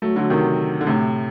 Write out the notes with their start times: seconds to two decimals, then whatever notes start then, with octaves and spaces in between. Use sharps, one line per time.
0.02 F#3 A3
0.16 D3 F#3
0.30 C3 D#3
0.81 D3
0.87 A2 C3